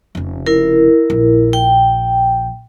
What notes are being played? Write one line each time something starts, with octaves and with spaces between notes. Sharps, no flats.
F1 C#3
E4 A#4
A#1
G5